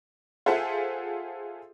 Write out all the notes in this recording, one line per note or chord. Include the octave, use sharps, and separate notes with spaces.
F4 G#4 A4 C5 E5 F#5